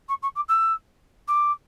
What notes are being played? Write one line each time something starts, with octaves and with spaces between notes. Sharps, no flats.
C#6
C#6
D6
E6
D6